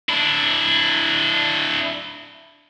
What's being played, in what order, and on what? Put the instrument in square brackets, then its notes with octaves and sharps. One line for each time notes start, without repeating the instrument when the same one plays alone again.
[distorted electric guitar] D4 E4